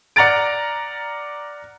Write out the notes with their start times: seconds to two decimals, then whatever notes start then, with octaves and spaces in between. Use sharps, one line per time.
0.16 D5 F#5 A#5 F6 A6 D7